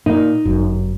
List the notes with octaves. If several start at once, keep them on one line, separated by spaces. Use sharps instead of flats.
A#2 D#4
G1 F#2